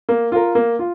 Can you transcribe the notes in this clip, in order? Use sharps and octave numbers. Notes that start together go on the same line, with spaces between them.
A#3
F4 A#4
A#3
F4